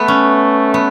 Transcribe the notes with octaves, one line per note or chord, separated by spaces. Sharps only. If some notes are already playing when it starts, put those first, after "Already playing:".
Already playing: A3 B3
C#4
B3